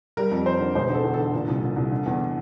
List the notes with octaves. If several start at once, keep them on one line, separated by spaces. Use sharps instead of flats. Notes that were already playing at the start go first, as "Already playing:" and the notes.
G3 A#4
F2
F2 C5
D3
E1 C5
D3
A4
E2
A4
D3
A#2
C2
A#2
C2
D3
E2